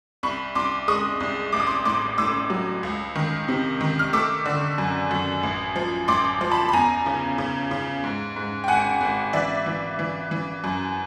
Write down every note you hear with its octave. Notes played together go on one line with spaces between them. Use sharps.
C2 B5 C#6
C2 C6 D6
G#3 C#6 D#6
C2
A1 D6
D#6
C6 D6
A2 C6 D6
A2 D6 E6
F#3
C#2
D#3
C3
D#3
F6
A3 D6 E6
D3
F#2
F#2
A1
F3
A1 C6 D6
F3
A5 B5
B5
E2 G#5 A#5
C#3
C#3
C#3
G#2
G#2
G5
G#1 F#5 G#5
G#1
E3 D5 E5
E3
E3
E3
F#2